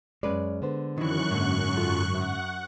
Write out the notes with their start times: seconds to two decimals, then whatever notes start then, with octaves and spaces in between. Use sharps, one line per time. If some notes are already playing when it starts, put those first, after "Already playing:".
0.23 F#2 G#3 C#4 B4 D5
0.62 D3 B3 C5
0.98 F#2 D#3 E3 C#6 F#6
1.31 G#2 D3 A#3
1.77 F4 F#4 A4
2.15 E5 F#5